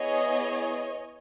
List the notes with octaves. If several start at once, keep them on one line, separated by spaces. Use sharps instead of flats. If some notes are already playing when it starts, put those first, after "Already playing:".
Already playing: B3 E4 G#4 C#5 D#5